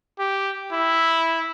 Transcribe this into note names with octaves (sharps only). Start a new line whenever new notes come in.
G4
E4